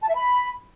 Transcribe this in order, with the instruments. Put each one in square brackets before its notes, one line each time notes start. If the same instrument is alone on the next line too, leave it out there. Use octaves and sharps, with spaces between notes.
[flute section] A5
E5
B5